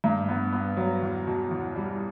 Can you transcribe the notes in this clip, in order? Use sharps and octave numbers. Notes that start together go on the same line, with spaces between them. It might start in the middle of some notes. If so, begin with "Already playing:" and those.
G2
B3
B3
F#3
E2
B2
E2
G3